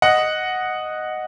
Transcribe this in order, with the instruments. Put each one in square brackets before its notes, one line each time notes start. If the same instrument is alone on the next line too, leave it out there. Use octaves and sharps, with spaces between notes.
[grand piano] D#5 F#5